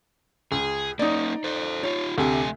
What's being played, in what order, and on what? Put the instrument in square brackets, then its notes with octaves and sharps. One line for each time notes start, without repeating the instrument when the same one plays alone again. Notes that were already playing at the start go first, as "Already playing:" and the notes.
[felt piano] C#2 [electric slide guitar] G#4
[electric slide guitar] A#3 C#4 [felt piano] D#4 D5
[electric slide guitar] A4 C5
[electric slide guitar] D#4 F4 [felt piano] C#5
[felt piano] D2 C3 G4 [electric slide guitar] A3 G#5